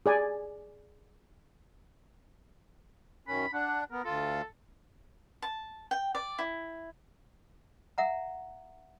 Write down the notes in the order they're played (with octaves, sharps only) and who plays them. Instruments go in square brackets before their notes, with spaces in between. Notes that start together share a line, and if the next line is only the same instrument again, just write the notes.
[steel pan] G#4 D5 G#5
[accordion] F#2 D#3 C#4 [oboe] B5
[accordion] D4 [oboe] F#5
[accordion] B3 [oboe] A#4
[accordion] D2 F4 [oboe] A4
[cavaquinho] A5
G5
D5
E4
[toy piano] E5 F#5 A#5